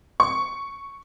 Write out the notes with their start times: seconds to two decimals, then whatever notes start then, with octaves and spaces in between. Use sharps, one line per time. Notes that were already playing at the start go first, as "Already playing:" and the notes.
0.20 C#6